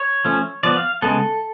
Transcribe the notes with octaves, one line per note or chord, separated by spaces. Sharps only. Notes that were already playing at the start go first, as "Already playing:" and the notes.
Already playing: C#5
F3 A3 C#4
F3 B3 D5
F5
C#3 G#3 B3 A4